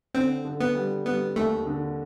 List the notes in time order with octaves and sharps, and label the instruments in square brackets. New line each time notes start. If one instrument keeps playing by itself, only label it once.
[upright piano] D3 [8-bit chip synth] C4
[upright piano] D3
[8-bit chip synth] B3
[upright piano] G3
[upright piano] G3 [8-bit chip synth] B3
[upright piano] D#2 [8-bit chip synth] A3
[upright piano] D3